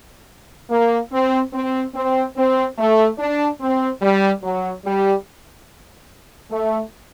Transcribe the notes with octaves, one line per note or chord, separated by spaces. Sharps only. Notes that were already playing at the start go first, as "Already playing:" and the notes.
A#3
C4
C4
C4
C4
A3
D4
C4
G3
F#3
G3
A3